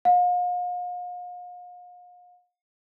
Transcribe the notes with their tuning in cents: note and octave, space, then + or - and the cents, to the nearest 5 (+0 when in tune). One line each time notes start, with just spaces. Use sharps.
F5 +40